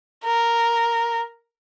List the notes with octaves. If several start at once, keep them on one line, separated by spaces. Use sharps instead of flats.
A#4